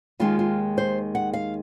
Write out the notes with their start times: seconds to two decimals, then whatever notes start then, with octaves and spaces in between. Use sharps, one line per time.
0.20 D#2 D#3 G#3 D#4 F4
0.39 F4
0.78 C5
1.15 F#5
1.33 F5